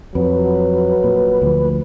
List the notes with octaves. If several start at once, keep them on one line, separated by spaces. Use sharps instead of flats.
F2 F#3 B4
A#2
D2 F3